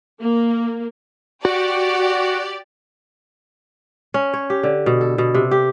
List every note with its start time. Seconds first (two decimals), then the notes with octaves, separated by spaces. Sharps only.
0.21 A#3
1.45 F#4 G4 D5
4.14 C#4
4.34 C#5
4.50 G4
4.63 D3
4.86 B2
5.01 A4
5.18 B2
5.35 C3
5.51 G4